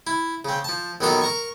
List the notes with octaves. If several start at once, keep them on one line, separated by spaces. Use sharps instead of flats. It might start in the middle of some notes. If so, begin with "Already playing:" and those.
E4
C#3 C4
F3 A5
A#1 D#3 F#3 B3 A4 A#4
A#4 A#5 C#6